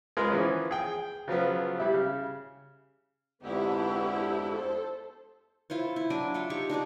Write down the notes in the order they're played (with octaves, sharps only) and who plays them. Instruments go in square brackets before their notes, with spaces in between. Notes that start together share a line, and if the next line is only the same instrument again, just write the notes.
[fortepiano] G#3 F4 A#4 B4
E3 F3 B3 C#4
G#4 G5
C#3 F3 F#3 B3
G3 E4 G4
C#3
[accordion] F2 G#2 D3 [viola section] B3 E4 G4
[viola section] A4 C5
[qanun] E4 F4 C5 C#5
E4
F#3 D4 G#5 D6
F4 C#5 E5
D#4 G4 C#6
D4 D#4 F#4 G#4